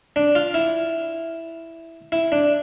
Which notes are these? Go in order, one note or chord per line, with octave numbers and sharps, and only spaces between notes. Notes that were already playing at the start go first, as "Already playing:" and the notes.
D4
F4
E4
E4
D4